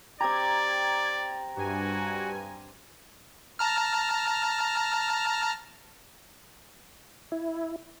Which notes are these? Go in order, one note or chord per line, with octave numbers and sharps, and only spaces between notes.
C4 G4 D5 A#5 G#6
G2 F#4 G#5
A5 A#5 F6
E4